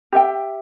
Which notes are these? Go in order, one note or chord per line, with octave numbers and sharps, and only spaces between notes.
G4 E5 G5